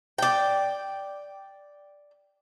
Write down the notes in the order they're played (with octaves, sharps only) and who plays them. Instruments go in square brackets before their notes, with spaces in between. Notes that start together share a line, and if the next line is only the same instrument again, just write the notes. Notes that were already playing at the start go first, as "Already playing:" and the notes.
[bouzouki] D5 G5